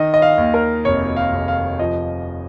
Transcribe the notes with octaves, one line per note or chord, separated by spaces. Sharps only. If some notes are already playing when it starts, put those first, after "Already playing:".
Already playing: D#3 D#5
D#5
F5
D#2
A#4
F1 C#5
F5
F1
F5
F3 D#5